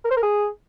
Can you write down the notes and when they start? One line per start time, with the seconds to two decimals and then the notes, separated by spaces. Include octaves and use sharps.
0.05 A#4
0.11 C5
0.17 A#4
0.23 G#4